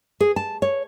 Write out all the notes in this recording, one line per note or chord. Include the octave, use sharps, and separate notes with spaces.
G#4
A5
C#5